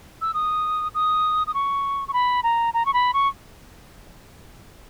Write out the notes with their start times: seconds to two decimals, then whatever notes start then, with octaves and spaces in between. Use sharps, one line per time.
0.21 E6
0.34 D#6
0.94 D#6
1.47 D#6
1.54 C#6
2.08 C#6
2.13 B5
2.43 A#5
2.74 A#5
2.85 C#6
2.94 B5
3.14 C#6